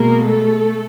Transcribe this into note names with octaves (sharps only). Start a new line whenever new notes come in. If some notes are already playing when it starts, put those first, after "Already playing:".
Already playing: B2 G#3 A#3 A#4
A3 A4